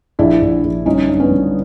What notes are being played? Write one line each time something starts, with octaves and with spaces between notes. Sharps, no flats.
A#1 D4 E4
A#1
A#1
G1 C#4 D#4
G2
B3 C#4
G1